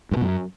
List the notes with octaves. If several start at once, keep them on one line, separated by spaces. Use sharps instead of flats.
G2
B2
F#2